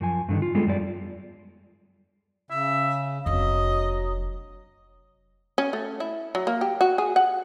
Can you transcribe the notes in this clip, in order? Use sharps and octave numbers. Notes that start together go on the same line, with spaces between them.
F#2 F3 G#5
G2 D3 D#3
F4
G3 G#3 B3 F4 G#4 A4
F#2 G3 D5
C#3 E5
F1 F#3 D4 D#5
C#4
A3
E4
F#3
A#3
G4
F#4
G#4
F#5